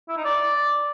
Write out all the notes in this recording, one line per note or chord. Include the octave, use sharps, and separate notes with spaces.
E4
D#4
D5